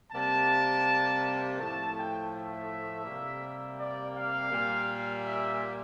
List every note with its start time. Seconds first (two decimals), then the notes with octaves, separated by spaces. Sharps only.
0.12 C3 G3 A#3 A5
1.59 A2 F3 A3 A5
1.96 G5
2.32 E5
3.05 C3 G3 A#3
3.78 D5
4.15 F5
4.51 A#2 G3 A#3
5.24 E5